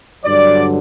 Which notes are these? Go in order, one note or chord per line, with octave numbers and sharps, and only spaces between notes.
G2 D3 F#3 D5